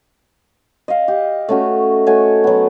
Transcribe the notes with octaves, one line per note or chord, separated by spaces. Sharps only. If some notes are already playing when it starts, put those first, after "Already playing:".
D#5 F5
G4
A3 C#4 F#4
A3 F#4 C#5 G#5
F#3 B3